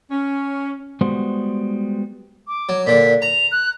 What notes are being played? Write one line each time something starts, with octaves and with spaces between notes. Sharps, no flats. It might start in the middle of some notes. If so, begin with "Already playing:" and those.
C#4
G3 G#3 B3 F#4 C5
D6
F#3
A#2 D3 B6
A#5 F7
F#6